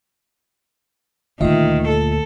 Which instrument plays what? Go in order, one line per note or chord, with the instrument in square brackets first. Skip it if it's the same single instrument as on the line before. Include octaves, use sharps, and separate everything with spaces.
[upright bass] D2 A#2 [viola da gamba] D#3 [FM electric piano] F4 D#5 E5
[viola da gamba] A4